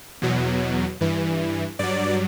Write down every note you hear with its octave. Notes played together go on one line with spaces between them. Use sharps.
E2 B2 F#3
G2 E3
G2 F#3 D5